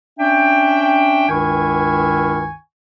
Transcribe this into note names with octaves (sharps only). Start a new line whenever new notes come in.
C#4 D4 E5 G5
C#2 G2 D#3 E4 G#5 C#6